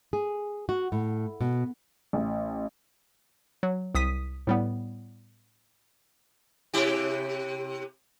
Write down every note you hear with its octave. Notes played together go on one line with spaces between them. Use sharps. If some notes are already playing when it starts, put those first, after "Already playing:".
G#4
F#4
A2
B2
A1
F#3
C2 D#6 B6 D#7
A2 G3 B3
C3 E4 G4